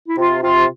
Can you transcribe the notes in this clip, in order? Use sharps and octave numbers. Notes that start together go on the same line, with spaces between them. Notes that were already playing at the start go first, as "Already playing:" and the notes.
E4
C3 F4
C3 F4